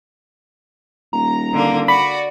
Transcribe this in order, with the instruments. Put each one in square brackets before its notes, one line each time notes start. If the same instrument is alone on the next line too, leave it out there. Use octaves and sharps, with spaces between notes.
[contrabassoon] D#1 [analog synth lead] A#5
[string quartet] D3 A#3
[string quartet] F#4 [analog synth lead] D5 [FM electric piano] B5